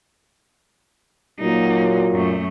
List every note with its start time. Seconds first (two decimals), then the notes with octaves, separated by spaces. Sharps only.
1.40 A#2 F#3 A#3 D#4
2.12 F#2 A3